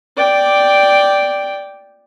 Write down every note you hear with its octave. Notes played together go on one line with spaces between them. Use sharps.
D5 G5